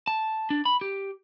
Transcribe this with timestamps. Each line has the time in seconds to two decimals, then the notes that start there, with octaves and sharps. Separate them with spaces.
0.07 A5
0.50 D4
0.65 B5
0.81 G4